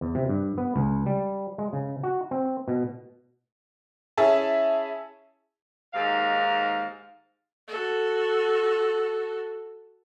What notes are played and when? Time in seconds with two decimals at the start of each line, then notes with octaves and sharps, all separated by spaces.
0.01 E2
0.15 C3
0.29 G2
0.58 B3
0.76 C#2
1.06 G3
1.58 G#3
1.73 C#3
2.03 F#4
2.31 C4
2.68 B2
4.17 C#4 E4 G#4 E5 A5
5.94 D#2 G#2 F5
7.68 F#4 A4